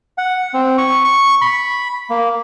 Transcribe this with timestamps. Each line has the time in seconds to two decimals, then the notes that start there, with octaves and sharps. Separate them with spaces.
0.18 F#5
0.54 C4
0.78 C#6
1.05 C#6
1.41 B5
2.10 A#3